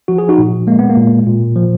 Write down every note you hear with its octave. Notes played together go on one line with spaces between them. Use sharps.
F3 F#4
G#4
D#4 F#4
A#2
G#3 A#3
B3
A#3
A#2
A#2
F3